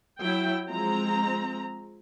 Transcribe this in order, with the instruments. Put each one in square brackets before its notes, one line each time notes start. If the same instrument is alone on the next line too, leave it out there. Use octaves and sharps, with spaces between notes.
[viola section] F#3 E4 G5
F3 G#3 C4 A#5